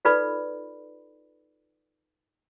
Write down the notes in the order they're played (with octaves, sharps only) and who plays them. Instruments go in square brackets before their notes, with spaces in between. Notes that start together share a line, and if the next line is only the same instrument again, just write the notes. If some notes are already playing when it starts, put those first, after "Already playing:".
[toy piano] D#4 F4 A4 B4 D5 B5